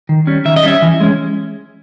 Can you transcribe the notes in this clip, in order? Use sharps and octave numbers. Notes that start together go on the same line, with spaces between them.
D#3
G3 C#4
D#3 E5
D#5
G3 C#4 E5
E3
G#3 C#4